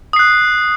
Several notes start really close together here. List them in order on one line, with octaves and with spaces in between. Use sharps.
D#6 C7 F#6